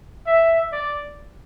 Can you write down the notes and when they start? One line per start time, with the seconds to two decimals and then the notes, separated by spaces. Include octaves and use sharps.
0.26 E5
0.73 D5